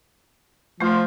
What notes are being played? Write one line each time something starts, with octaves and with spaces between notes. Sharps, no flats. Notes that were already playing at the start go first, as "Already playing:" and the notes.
F3 A3 F4 C5 C#6